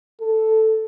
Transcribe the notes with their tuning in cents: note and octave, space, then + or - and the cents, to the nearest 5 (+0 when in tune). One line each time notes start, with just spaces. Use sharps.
A4 +0